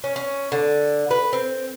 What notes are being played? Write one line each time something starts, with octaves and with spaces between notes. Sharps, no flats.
C#4
C#4
D3
B4
C4